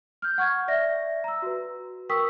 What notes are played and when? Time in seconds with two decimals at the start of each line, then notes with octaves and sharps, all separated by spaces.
0.22 F6 G6
0.38 F#5 C#6 F6 G#6
0.68 D5 E5 A#6
1.24 A#5 E6
1.42 F#4 B4
2.09 A#4 G5 C#6 D#6 E6 B6